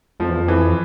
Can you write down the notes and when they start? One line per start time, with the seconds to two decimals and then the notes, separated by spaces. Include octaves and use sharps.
0.20 F2 F3
0.29 E2
0.38 F2
0.48 E3